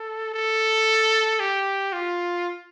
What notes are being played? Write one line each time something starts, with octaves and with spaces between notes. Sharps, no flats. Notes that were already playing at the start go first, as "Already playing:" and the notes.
Already playing: A4
A4
G4
F4